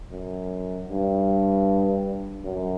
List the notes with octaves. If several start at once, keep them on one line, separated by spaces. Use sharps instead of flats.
F#2
G2
F#2